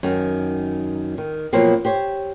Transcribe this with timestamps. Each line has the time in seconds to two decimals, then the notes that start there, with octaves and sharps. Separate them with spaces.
0.03 F#2 D#3
1.18 D#3
1.53 B2 F3 F#3 A#3 C4
1.85 G4 C5 C#5